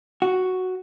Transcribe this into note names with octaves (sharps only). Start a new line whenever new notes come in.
F#4